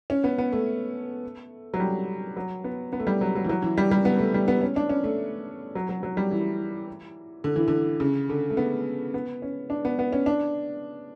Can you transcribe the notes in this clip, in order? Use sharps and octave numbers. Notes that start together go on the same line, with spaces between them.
C#4
B3
B3
A3
F#3
G3
F#3
B3
B3
A3
G3
F#3
F#3
E3
F#3
E3
G3
G3
B3
A3
G3
B3
C#4
D4
C#4
A3
F#3
F#3
F#3
G3
E3
D3
E3
D3
C#3
D3
A3
B3
B3
C#4
D4
B3
B3
C#4
D4